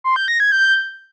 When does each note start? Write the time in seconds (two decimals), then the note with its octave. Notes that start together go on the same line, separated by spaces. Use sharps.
0.04 C6
0.16 G6
0.28 A#6
0.40 G#6
0.52 G6